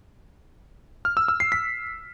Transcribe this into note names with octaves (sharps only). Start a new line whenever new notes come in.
F6
E6
E6
C7
B6